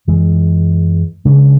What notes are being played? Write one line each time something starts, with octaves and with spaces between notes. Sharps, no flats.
F#2 E3 G#3
C#3 G#3 D4